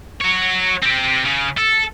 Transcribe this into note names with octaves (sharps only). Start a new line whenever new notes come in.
F#4 C#5
C4 G4
C#3
A4